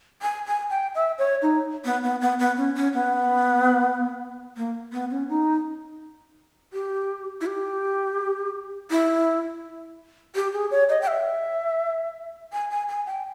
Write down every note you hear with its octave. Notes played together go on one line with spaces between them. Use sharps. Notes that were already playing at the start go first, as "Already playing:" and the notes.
G#5
G#5
G5
E5
C#5
D#4
B3
B3
B3
B3
C#4
C#4
B3
A#3
B3
C#4
D#4
G4
E4
G4
E4
G4
G#4
C#5
D#5
G5
E5
G#5
G#5
G#5
G5